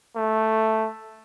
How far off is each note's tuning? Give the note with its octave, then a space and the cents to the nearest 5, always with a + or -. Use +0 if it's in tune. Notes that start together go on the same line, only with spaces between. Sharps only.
A3 +0